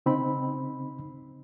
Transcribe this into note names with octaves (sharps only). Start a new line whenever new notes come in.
C#3 C4 D#4 B5